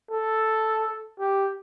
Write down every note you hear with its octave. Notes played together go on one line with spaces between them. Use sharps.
A4
G4